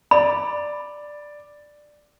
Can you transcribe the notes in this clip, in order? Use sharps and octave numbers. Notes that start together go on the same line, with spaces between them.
D5 B5